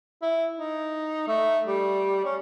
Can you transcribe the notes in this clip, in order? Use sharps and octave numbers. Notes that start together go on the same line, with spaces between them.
E4
D#4
A3
G3
C#4